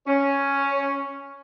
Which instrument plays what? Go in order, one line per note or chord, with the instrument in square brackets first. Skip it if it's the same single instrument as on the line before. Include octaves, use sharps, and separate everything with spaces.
[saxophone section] C#4